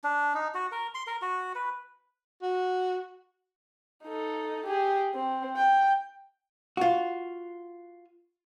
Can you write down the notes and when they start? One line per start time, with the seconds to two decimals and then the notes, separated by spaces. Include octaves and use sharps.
0.04 D4
0.34 D#4
0.54 F#4
0.72 A#4
0.94 C6
1.07 A#4
1.22 F#4
1.55 B4
2.42 F#4
4.04 D#4 A4
4.67 G4 G#4
5.15 C4
5.56 G5
6.77 F4 F#4